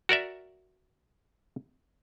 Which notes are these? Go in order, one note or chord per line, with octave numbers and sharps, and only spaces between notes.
F#4 A#4 D5 E5